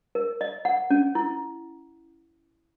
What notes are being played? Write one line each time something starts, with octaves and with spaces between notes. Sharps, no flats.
A#4
D#5
F#5
C#4
E4